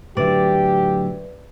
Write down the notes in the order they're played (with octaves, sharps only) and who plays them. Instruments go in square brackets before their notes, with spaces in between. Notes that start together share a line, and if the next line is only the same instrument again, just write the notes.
[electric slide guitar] A2 D3 F#3 [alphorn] G4 [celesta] B4 E5 [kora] D5